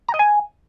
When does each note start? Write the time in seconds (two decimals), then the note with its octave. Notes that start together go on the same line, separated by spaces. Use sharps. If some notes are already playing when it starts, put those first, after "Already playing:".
0.08 A#5
0.14 D#5
0.19 G#5